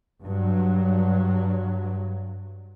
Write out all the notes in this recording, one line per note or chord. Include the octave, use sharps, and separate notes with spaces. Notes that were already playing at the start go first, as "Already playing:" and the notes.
G2 F#3